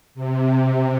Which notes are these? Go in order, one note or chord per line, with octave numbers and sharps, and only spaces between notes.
C3